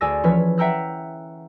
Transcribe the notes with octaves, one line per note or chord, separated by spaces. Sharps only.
D2 G#4 D5 G#5 E6 A#6
E3 F3 C#4 B4 C#5
E5 F#5 G5 A#5 E6 F#6